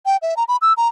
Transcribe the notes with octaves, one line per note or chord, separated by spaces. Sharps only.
G5
E5
A#5
B5
E6
A#5